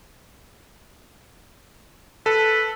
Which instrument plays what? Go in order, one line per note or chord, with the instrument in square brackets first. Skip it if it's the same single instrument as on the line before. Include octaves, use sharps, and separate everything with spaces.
[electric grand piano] A4 [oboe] B4